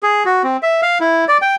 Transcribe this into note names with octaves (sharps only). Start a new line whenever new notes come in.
G#4
F#4
C4
E5
F5
E4
D5
G5